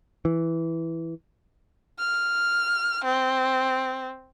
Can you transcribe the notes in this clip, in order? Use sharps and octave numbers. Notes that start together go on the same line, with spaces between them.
E3
F6
C4